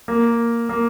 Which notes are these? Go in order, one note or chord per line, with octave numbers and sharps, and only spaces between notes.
A#3
A#3